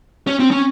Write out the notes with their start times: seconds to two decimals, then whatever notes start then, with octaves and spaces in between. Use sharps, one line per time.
0.27 C#4
0.40 C4
0.51 C#4